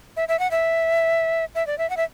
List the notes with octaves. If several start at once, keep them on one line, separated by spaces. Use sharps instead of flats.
E5
E5
F#5
E5
E5
D5
E5
F#5
E5